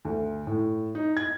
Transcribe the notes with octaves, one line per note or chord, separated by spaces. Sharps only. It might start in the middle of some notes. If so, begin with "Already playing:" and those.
D2
A2
D#4
G#6